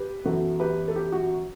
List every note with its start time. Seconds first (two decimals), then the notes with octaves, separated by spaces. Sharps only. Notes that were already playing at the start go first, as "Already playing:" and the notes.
Already playing: G4 B4
0.24 F#2 E3 B3 F#4 A4
0.60 G4 B4
0.88 A4
0.96 G4
1.12 F#4